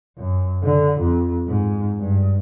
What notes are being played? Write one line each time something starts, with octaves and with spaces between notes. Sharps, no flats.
F#2
D3
F2
G#2
G2